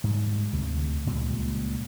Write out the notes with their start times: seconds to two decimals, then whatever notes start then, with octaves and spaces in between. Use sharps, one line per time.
0.04 G#2 G3
0.53 D2 C3
1.06 C#2 A#2 G3 G#3